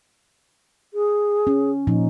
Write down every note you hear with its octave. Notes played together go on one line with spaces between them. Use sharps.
G#4
C#4
A#2 F3 D#4